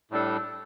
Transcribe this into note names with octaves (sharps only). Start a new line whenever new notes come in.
A2 G3 D4 A4